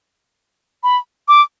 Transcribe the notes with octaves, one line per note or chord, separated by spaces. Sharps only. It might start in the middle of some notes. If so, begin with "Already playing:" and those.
B5
D6